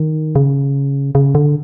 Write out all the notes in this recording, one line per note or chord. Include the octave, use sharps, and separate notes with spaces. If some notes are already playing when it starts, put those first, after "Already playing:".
Already playing: D#3
C#3
C#3
D3